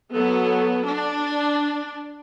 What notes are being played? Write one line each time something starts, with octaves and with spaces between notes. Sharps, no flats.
F#3 B3 A4
D4